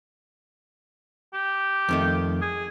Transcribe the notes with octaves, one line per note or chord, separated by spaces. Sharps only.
G4
F2 D#3 A3
G#4